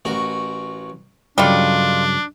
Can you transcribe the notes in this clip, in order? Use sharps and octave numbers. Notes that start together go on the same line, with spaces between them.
A1 F#4 A#4
G2 C#3 F#3 G3 D4 D#4 F4 A4